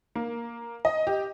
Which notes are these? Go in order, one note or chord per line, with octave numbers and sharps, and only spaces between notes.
A#3
D#5
G4